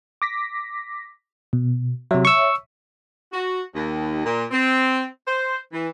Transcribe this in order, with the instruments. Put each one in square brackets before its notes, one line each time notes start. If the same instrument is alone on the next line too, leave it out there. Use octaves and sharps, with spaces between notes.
[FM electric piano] D6 A#6 B6
B2
[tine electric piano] C3 F#3 [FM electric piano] C#5 E5
[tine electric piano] C#6 E6
[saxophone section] F#4
D#2
A#2
C4
C5
E3